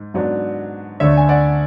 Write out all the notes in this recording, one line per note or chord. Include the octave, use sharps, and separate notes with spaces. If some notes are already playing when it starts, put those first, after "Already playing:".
Already playing: G#2
G#2 F#3 B3 D4
D2 D3 A3 D4 C#5 E5
G#5
D5 F#5